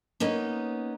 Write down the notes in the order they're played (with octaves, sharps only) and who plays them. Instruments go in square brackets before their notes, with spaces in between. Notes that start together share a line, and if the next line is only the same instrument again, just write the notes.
[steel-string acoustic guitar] A#3 B3 C#4 D#4